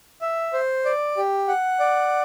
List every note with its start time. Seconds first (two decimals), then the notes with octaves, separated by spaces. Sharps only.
0.22 E5
0.53 C5
0.85 D5
1.17 G4
1.48 F#5
1.80 D5